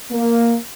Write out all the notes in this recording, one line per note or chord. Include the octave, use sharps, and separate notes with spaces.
A#3